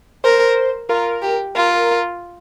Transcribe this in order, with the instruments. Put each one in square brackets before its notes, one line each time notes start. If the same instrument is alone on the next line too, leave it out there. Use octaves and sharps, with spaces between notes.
[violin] A#4 [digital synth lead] C5
[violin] F4 [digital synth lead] A#4
[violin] G4
[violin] F4 [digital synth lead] A#4